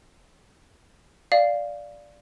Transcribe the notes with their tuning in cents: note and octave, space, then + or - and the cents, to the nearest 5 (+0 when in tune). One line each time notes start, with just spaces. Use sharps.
D5 +0 F5 +0